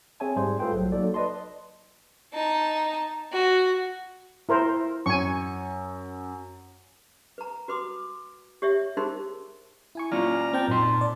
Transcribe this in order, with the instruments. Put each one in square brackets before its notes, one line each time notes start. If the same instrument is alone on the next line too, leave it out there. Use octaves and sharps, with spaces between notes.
[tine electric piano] C4 G#4 C#5 E5 G#5 A5
G#2 G3 G#4 C5 C6
A3 F4 A4 B4 C5 G5
A#1 F#3
F#3 A#3 D#4 A4 D5
B4 D5 D#5 A5 C6
[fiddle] D#4 A5
F#4
[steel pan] E4 A#4 C5
[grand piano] F#2 [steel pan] G#5 C#6
[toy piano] B4 A#5
F#4 B4 C6 D6 D#6
G4 C#5 E5
D#4 G4 G#4 A#4 C5 C6
[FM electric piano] E4 G#5 C#6
[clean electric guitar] A#3 C#4 F4 [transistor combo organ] D5 A#5 F6
[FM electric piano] C4 G5 A5
[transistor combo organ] F#2 [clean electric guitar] A#2 C6 [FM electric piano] C4 D#4
[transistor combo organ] A5
[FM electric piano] D5